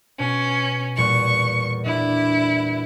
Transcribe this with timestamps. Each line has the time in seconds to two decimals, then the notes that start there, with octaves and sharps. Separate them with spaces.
0.19 B2 C#4
0.98 E2 A#2 G3 C#6
1.86 G3 D4 E4